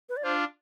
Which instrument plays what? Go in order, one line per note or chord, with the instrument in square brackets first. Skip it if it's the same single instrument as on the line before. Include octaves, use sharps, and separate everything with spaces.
[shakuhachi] B4
D5
[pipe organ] D4 F4 [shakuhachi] C5